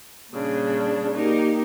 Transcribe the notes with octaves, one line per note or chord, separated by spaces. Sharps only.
A#2 C#3 G3 D4
A#3 D#4 G4 A#4